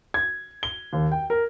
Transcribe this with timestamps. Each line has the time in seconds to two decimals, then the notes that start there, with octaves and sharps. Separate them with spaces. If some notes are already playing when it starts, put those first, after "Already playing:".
0.14 G#6
0.63 G7
0.93 D#2
1.12 G5
1.30 A#4